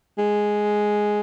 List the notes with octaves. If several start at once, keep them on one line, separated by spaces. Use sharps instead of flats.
G#3